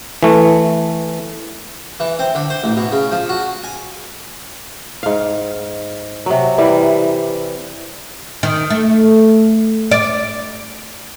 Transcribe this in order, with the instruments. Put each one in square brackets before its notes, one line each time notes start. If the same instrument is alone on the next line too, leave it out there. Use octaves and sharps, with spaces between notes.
[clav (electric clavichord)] E3 A3
[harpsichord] E3
C4
D3
C5
A1
B2
C#3
F3
F#4
G#5
[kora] G#2 F5
C3 F#3
E3 G3
[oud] D#3
A3
D5